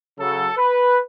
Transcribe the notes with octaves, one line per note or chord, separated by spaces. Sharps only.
C#3 F#3 A4
B4